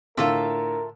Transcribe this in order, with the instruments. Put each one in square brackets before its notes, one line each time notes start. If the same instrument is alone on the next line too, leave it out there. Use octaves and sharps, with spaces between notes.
[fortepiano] A2 D3 C6 [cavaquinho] F4 A4 E5 [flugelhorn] A#4